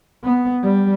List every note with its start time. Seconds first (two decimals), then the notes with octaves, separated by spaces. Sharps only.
0.24 B3
0.63 G3